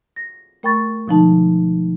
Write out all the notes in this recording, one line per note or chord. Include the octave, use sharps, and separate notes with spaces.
A#6
A3 A#4 G5 B5 C#6 A6
B2 D3 F3 G#3 D#4 A5